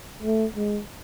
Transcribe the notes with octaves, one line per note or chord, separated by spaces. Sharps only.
A3
G#3